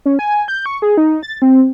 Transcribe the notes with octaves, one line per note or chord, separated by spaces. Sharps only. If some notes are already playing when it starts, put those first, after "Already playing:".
C#4
G#5
G6
C#6
G#4
D#4
A6
C4